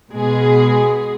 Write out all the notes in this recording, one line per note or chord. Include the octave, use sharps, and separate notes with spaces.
B2 G#3 G#4